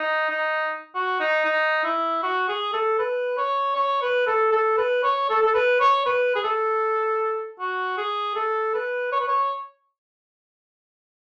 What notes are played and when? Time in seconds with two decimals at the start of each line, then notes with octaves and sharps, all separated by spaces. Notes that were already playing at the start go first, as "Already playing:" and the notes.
Already playing: D#4
0.30 D#4
0.95 F#4
1.20 D#4
1.45 D#4
1.84 E4
2.23 F#4
2.48 G#4
2.73 A4
2.99 B4
3.38 C#5
3.76 C#5
4.02 B4
4.27 A4
4.52 A4
4.77 B4
5.03 C#5
5.29 A4
5.43 A4
5.54 B4
5.80 C#5
6.06 B4
6.35 G#4
6.44 A4
7.60 F#4
7.97 G#4
8.35 A4
8.74 B4
9.12 C#5
9.20 B4
9.28 C#5